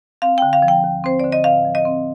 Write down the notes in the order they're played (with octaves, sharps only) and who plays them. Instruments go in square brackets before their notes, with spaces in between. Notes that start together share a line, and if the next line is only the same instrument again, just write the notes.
[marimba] C4 F5
D3 G5
F5
F3
G5
D#2
C4 C5
D3 D5
D#5
A2 F5
F3
D#5
C4